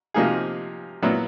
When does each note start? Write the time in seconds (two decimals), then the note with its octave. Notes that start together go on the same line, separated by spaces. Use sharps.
0.14 C3 F3 A#3 D#4 G#4
1.02 A#2 F#3 B3 E4